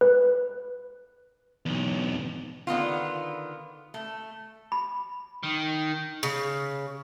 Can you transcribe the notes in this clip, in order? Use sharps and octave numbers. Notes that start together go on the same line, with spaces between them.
B4
B1 E2
D3 D#3 B3 F4
A3
B5
D#3
C#3